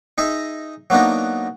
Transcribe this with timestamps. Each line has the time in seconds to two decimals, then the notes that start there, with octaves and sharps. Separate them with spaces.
0.18 D#4 G#4 D#5 E5
0.90 F#3 A#3 B3 D4 D#4